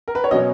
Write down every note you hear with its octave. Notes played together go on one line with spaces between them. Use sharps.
A#4
B4
C#5
B2 F#3 C#4 D#5